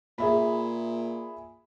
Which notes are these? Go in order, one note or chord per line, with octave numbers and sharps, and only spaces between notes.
A#2 G#4 E5 B5